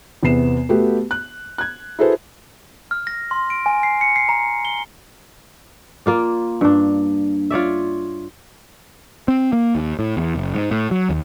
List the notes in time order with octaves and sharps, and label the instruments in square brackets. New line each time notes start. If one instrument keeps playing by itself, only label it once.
[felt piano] E2 C3 B3 C7 E7
A3 B3 F#4 G4
F#6
F#6 G#6
E4 F#4 G#4 A4 B4 C5
[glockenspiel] F6
A#6
C6
D7
G#5
C7
C#7
C7
A#5
G7
[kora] A#3 F4 D5
G2 D4
F4 C#5 D5 E5
[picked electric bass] C4
A#3
D#2
A2
E2
F#1
G#2
A2
F#3
D#2